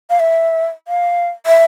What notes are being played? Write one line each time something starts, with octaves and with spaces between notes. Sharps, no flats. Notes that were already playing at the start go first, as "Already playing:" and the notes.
F5
E5
F5
E5